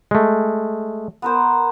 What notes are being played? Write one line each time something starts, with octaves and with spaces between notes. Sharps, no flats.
G#3 A3
B3 A#4 C5